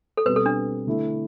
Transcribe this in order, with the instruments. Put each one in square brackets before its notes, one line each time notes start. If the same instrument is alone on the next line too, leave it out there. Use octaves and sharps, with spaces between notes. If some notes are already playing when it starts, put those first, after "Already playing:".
[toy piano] A4
[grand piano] B2 G3 C4 [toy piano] B4
[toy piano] A4
D4
[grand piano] D3 A3 E4